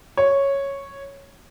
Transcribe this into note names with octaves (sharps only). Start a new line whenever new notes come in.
C#5